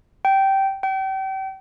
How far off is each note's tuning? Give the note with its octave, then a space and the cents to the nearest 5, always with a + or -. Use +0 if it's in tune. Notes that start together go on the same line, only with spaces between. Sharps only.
G5 -15
G5 -35